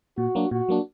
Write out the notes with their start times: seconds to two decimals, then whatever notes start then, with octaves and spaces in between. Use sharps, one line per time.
0.18 A#2 F#4
0.35 F#3 A#3 D4
0.51 A#2 F#4
0.69 F#3 A#3 D4